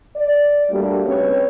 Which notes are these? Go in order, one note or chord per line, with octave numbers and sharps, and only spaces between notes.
D5
G3 A3 A#3 D4 F#4 G4
C#3 C4 C#4 B4 C#5